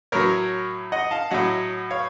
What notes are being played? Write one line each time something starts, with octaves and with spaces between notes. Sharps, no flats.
A2 F#3 A#4 C#5
D#5 F#5
F5 A5
A2 F#3 D#5 F#5
C#5 F5